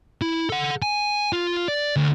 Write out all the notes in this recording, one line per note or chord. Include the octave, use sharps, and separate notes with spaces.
E4
A4 F#5
G#5
F4
D5
D2